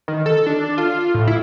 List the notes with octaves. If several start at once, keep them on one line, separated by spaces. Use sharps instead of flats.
D#3
A4
D4
F4
A2
E4